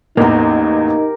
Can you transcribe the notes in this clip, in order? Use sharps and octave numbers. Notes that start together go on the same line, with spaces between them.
A1 E2 A#3 D#4 G4 A#4